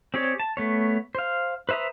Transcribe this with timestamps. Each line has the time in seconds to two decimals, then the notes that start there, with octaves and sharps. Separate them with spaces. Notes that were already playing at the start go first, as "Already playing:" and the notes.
0.14 C4 G4 G#4 C#5 D5
0.40 A5
0.57 A3 B3 C#5
1.15 C5 F5
1.69 B4 C5 E5 A#5 D#6